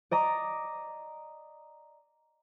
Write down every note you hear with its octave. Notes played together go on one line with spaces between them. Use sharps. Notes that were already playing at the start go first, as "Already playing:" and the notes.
D5 D#5 A#5 D6